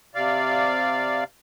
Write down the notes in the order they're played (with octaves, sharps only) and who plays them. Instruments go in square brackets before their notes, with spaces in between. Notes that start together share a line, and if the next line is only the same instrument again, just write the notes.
[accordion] C3 D5 F5